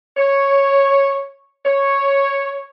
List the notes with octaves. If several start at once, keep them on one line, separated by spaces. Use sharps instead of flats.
C#5
C#5